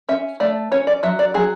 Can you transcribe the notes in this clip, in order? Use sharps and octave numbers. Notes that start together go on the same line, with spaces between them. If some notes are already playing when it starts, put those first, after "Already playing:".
C#4 E5
A3 D5
C#4 C#5
D5
F#3 E5
D5
F#3 G#4